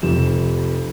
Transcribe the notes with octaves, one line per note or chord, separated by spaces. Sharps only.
F1 F2 E7